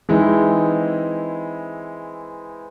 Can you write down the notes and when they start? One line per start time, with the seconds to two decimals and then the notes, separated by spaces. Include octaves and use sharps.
0.09 E3 G#3 C4 D#4 E4